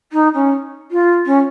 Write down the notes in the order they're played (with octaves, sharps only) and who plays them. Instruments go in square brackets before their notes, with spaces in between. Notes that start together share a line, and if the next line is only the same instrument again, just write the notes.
[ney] D#4
C#4
F4
C#4